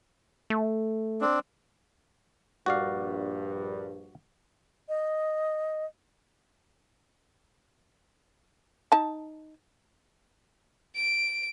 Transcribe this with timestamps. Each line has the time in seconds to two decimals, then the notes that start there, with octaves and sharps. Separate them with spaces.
0.50 A3
1.21 C4 D4
2.66 A#1 G2 F#4 D5 F5
4.88 D#5
8.92 D#4 A5
10.96 D7